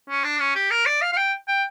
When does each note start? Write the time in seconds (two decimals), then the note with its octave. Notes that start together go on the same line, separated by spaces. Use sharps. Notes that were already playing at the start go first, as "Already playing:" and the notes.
0.09 C#4
0.24 D4
0.40 C#4
0.55 G4
0.71 A#4
0.86 D5
1.01 F5
1.12 F5
1.17 G5
1.48 G5